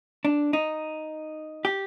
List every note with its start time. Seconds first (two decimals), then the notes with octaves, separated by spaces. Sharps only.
0.25 D4
0.53 D#4
1.65 G4